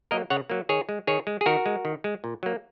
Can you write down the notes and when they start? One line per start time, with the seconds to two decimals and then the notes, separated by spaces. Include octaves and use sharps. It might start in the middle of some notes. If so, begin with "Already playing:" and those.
0.11 F#3 A#3 A#4 D#5
0.30 C#3 C#5 F#5
0.50 F#3 A#3
0.69 D#3 G#4 C#5
0.89 G#3
1.07 D#3 G#4 C#5
1.27 G#3
1.41 G#4
1.46 D#3 F#4 A#4
1.66 G#3
1.85 D#3
2.04 G#3
2.24 A#2
2.43 F#3 A#3